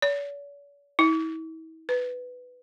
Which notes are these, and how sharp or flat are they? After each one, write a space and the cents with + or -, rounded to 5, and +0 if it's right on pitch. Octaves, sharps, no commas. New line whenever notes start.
C#5 +45
E4 -40
B4 +10